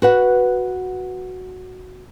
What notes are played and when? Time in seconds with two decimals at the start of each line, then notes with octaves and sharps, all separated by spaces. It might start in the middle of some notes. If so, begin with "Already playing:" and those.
0.02 F#4 B4 F#5